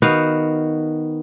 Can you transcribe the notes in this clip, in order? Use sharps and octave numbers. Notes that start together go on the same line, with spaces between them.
D#3 B3 F#4 F5